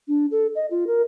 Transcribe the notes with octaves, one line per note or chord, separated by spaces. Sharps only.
D4
A4
D#5
F4
A#4